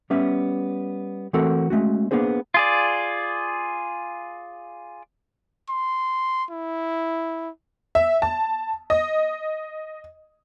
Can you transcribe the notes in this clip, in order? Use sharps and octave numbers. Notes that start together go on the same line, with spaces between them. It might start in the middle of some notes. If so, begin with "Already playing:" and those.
G3 B3 C#4 E5
E3 A3 C4 F#4 A4 A#4
G#3 A3 C#4 F#4
A#3 B3 D4 G#4 C5
F4 G#4 D5
C6
E4
E5
A5
D#5